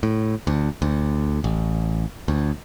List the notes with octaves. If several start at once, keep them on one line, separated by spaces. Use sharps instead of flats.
A2
D2
D2
A1
D2